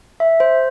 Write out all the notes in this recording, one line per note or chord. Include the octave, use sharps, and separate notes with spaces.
E5
C5